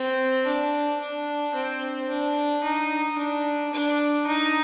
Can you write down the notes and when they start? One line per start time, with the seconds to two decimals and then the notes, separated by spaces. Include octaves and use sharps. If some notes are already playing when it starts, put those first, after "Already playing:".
Already playing: C4
0.46 D4
1.01 D4
1.55 C4
2.09 D4
2.64 D#4
3.18 D4
3.73 D4
4.28 D#4